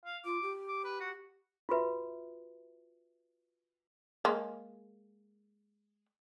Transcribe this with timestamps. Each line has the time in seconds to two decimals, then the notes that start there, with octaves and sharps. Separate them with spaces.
0.05 F5
0.25 F4 D6
0.42 G4
0.68 D6
0.84 B4
1.00 F#4
1.69 F4 F#4 B4 E5
4.25 G#3 A#3